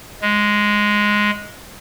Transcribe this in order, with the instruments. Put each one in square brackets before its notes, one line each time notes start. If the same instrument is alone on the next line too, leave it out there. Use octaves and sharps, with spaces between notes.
[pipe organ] G#3